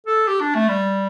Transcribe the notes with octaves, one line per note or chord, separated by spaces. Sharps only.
A4
G4
D4
A3
G3